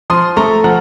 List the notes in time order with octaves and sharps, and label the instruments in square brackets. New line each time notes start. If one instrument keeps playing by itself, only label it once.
[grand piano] F3 C6 D#6
A3 A#5 C#6
F3 F#5 A#5